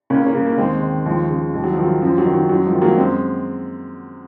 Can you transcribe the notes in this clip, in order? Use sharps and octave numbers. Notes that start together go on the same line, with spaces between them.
C#2 A#3 C#4
A#3 C#4
C#3
A#3
D#2 G#3 C4
D#3
D#2 F3 G#3
C#3
D#2 G#3
F#3
D#3 F3
F#3
F#2 F3
F#3
D#3
F#3
F#2 F#3
F3 G#3
D#3
F#3 A#3
F#2 G#3 C4